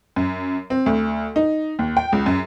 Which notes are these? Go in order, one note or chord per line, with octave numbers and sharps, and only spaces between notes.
F#2
C4
D2
D#4
D#2
G5
C#2
F#2